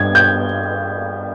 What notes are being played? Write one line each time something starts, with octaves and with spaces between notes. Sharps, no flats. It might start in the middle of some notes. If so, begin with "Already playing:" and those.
Already playing: G2 G#6
G6